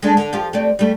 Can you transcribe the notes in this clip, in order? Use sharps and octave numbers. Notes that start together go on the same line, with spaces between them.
G#3 A3 D4
D3
F3 F4 G4
A3 C4 D5
G3 A3